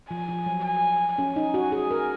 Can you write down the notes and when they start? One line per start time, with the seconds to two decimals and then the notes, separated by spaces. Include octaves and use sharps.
0.10 F3 G#5
0.28 F3
0.46 F#3
0.64 G#5
1.18 C#4 G#5
1.36 D#4
1.54 F#4
1.72 G#4
1.91 A#4